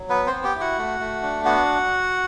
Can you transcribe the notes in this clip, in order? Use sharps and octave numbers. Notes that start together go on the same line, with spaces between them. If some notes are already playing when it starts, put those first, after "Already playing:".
Already playing: F#3
B3 B4
C4 C5
B3
G4 G5
E4
F#4 F#5
A3
A3
D4
B3 F#4 F#5